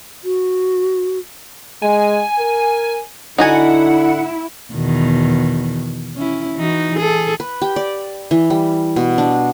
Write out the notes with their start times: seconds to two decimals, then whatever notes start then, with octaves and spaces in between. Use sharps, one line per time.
0.24 F#4
1.82 G#3 G#5
2.39 A#4
3.38 D3 D#4 E4 F#4 F#5 G#5
4.74 E2 B2 D#3
6.16 C#4 E4
6.58 E3 D#4 F#4
6.95 G#4 A4
7.40 B4
7.61 G4
7.76 D5
8.31 E3
8.50 G3
8.96 B2
9.18 D4